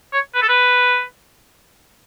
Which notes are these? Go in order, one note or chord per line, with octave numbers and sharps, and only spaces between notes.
C#5
B4
A4
B4